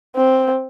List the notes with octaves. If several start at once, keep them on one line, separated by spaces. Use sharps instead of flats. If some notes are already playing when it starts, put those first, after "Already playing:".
C4